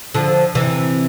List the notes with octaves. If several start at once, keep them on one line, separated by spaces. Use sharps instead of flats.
D3 F3
C3 E3